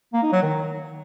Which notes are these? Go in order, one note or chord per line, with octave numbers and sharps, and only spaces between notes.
A#3
D#4
F#3
D#3